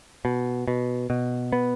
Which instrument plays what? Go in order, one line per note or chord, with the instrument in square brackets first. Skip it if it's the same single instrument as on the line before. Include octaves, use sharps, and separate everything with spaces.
[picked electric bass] B2
B2
B2
B3